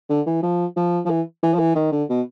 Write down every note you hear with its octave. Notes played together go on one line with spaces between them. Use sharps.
D3
E3
F3
F3
F3
E3
E3
F3
E3
D#3
D3
B2